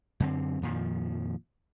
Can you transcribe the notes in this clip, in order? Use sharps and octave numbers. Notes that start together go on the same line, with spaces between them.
F#2 D3 C4
F2 A#2 D#3 F3